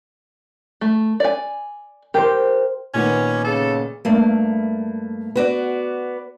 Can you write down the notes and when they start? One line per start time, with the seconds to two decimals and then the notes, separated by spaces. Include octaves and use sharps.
0.81 A3
1.20 D5 G#5
2.14 G4 A#4 C5
2.94 A#2 D#3 B3 C#4
3.45 C#3 A4
4.05 G2 A3 A#3
5.36 B3 F#4 D5